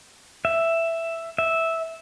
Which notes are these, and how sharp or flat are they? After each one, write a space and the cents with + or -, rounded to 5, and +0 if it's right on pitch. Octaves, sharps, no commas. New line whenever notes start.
E5 +5
E5 -10